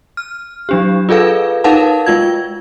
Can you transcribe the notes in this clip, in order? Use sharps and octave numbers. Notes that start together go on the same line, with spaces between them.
F6
F#3 D4 G4
F4 G#4 A4 B4 F5
D#4 A#4 B4 F5 F#5 A5
G#3 F4 G#6